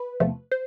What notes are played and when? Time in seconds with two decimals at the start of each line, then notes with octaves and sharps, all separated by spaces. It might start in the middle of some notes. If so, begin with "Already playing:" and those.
Already playing: B4
0.20 E2 C3 F3 A3
0.51 C5